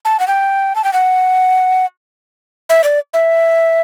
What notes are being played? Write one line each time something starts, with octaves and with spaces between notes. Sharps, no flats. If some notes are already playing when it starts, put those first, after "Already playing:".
A5
F#5
G5
A5
G5
F#5
E5
D5
E5